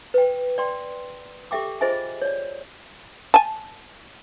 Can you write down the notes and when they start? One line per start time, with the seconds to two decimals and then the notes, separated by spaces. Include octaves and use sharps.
0.14 B4 G5
0.58 D5 G5 C6
1.51 G4 A4 E5 G5 D6
1.81 F4 G#4 C5 D#5 E5 G#5
2.22 C#5 D5
3.34 G#5 A5